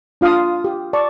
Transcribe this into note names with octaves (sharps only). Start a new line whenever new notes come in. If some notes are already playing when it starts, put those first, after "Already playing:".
D4 F4 F5 A5 D#6
G4
D5 A5 C#6